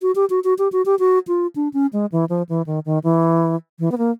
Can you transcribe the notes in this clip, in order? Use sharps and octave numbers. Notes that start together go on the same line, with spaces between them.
F#4
G4
F#4
F#4
G4
F#4
G4
F#4
F4
D4
C#4
G#3
E3
F3
E3
D#3
D#3
E3
E3
B3
A#3